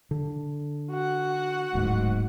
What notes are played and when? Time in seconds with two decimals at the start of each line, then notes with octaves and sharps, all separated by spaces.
0.11 D3
0.92 F#4 F#5
1.75 D1 G#2